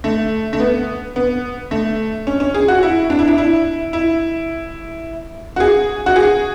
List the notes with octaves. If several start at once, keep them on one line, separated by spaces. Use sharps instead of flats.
A3
A3
B3
B3
A3
C#4
C#4
G#4
F#4
E4
D4
E4
D4
E4
E4
F#4
G#4
F#4
G#4